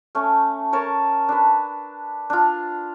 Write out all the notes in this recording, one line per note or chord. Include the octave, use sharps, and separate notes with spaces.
A3 C#4
A#4 C#5 A5
D4 B4
D4 F4